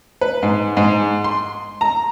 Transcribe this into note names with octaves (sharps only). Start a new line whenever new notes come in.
B4
G#2
G#2
C6
A#5